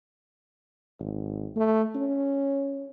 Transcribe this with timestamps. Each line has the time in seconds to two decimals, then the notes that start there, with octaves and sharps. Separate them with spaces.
1.00 G#1
1.56 A3
1.95 C#4